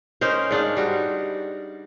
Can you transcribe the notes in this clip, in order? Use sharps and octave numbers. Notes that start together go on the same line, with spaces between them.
C#4 D#4 A#4 C5
G#2 D4 D#4 F5
G3 F#4